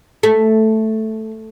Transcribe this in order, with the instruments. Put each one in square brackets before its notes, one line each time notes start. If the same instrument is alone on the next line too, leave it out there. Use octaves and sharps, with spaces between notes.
[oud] A3